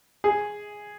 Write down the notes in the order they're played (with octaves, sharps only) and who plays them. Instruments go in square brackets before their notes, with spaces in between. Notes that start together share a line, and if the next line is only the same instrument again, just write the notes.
[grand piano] G#4